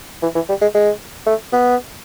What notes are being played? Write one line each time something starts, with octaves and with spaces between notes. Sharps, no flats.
E3
E3
G3
G#3
G#3
A3
B3